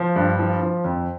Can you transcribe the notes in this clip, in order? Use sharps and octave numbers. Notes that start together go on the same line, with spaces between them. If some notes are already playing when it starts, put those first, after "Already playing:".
Already playing: F3
G2
F3
F3
F2